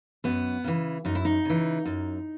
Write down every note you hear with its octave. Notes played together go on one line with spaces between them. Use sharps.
F#2 B3
C#3 E3
F#2 D#4
E4
D#4
C#3 E3
F#2